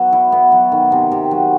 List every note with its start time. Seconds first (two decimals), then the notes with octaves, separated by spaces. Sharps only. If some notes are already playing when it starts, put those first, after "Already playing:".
Already playing: F#3 B3
0.13 E4
0.32 B3
0.52 F#3
0.72 D#3
0.92 C3
1.12 C3
1.31 F#3